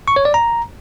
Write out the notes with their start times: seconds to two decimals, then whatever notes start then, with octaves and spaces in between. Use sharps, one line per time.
0.08 C#6
0.16 C#5
0.25 D5
0.34 A#5